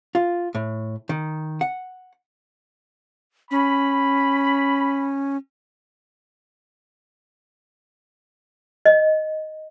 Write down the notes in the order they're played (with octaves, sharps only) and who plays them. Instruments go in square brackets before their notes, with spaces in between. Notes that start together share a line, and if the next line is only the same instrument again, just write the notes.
[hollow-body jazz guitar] F4
A2
D#3
F#5
[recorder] C#4 [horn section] B5
[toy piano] D#5